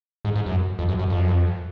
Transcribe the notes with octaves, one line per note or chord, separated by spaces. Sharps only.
G#2
G#2
F#2
F2
F#2
F#2
F2
F#2
F2